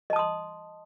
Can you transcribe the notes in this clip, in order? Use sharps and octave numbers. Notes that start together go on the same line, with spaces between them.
D#5 A5 C6 D#6